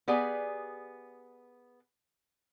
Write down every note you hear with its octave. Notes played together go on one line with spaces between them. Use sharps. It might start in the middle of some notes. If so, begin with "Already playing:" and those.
B3 G4 G#4 D5 G#5